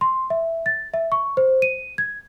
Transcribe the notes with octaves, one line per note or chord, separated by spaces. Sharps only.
C6
E5
A6
E5
C#6
C5
D#7
G#6